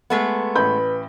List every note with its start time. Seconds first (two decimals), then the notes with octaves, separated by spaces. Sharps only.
0.10 G#3 A3 B3
0.56 A1 B4 B5 G6